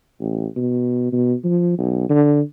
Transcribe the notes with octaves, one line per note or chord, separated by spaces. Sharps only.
A1
B2
B2
F3
B1
D3